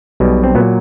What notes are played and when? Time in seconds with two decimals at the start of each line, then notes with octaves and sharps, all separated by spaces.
0.20 B1 B2 G3
0.44 C4
0.55 A#2 F#3 B3